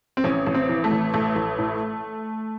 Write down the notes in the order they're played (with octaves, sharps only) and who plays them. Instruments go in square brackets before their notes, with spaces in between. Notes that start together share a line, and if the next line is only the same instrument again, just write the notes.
[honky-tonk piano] C4
A1 C#4
A1
C4
E3
A3
A1
A1 A3
A1
A2